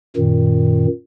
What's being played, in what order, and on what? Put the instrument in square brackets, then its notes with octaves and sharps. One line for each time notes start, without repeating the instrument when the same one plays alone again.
[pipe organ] F#2 A#2 D#3